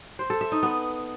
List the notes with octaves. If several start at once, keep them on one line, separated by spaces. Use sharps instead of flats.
C5
A4
E5
D#4
B3